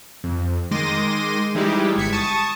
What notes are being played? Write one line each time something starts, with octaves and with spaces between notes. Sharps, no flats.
F2
D#3 G#3 C6 D6 A#6 D#7
E3 G3 G#3 D#4 E4 G4
G1 G#6 B6 C#7
A5 C#6 D#6